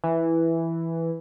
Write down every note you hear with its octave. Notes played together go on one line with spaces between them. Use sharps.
E3